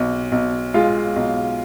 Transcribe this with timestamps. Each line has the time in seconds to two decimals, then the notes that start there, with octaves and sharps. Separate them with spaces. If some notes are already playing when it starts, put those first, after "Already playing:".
Already playing: B1
0.32 B1
0.74 G#3 F4 F5
1.16 B1